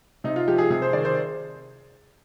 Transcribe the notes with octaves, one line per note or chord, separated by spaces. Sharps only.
C3 D#4
F4
F3 G4
G#4
C3 G#4
C5
D#3 D5
C5